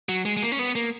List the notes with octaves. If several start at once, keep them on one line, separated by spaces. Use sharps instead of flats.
F#3
G#3
G#3
A#3
C#4
B3
A#3